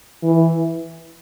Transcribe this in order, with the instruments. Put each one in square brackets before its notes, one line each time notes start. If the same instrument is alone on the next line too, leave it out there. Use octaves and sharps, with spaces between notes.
[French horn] E3